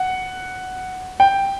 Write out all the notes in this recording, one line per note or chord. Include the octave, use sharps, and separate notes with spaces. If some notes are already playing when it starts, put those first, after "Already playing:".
Already playing: F#5
G5